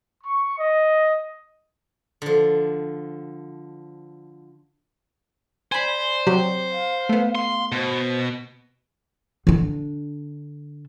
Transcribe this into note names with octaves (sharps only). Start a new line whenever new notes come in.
C#6
D#5
D3 F3
C5 D5 G#5 B5
C3 F#3 G4
F5
A3 B3
C6
B2 C5
D3 D4